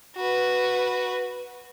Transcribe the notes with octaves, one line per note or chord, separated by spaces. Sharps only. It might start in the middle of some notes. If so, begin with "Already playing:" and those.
F#4 B4